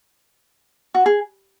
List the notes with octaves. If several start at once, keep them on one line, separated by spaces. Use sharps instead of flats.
F#4
G#4